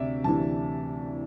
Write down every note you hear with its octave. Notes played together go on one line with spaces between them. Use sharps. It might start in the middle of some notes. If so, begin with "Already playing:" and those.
Already playing: D2 C3 D5 E5
D2 C3 E3 A5